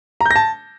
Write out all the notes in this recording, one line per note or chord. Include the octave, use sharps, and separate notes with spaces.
A#5
G6
A#6
A5